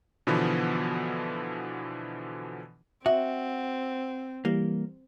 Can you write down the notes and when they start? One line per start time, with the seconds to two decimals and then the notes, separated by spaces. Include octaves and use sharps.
0.27 B2 D3 E3 F3 B3
3.06 C4 F#4 E5
4.45 E3 G3 A#3